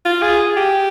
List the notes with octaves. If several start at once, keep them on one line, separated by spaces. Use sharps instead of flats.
F4
G#4
G4